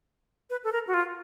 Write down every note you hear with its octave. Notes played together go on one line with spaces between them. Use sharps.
B4
A4
A#4
F#4
F4